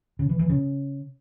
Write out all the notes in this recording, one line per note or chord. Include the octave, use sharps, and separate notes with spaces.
C#3
E3
E3
C#3